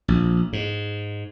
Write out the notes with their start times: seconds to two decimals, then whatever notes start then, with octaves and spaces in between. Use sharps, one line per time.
0.08 A#1
0.53 G#2